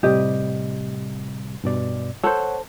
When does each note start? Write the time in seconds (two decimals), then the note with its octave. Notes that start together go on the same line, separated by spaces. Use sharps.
0.03 A2 C3 G3 G4 D#5
1.64 G2 B2 D5
2.24 A4 C5 C#5 F#5